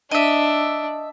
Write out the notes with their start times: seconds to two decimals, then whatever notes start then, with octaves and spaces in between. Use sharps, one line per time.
0.11 D4 D#5 E5